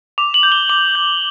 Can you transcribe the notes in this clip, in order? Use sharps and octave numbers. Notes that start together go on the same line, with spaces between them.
D6 F7
F#7
G6
G7
D6 F#7
G6